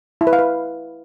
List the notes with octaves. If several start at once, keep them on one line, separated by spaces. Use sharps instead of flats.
E4
B4
F5
B4